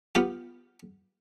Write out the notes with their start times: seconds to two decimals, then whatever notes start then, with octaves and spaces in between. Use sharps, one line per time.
0.15 B3 F4 G4